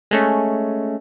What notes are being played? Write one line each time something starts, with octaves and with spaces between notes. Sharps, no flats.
G#3 A3 C#4